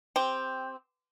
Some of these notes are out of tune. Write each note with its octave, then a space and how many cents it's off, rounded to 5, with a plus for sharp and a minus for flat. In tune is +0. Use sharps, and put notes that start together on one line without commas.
C4 +0 G4 +5